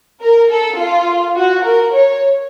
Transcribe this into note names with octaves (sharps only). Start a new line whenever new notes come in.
A#4
A4
F4
F#4
A#4
C#5